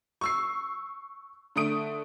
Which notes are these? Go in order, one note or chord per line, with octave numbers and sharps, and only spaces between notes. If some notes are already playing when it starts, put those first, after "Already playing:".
C#6 E6 C7
D3 A3 D#6 D7